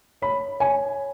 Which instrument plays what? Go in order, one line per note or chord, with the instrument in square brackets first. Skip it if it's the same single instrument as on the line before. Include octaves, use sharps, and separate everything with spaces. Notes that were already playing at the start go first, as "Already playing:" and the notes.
[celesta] C#5 [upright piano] B5
[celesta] C#5 [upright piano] G#5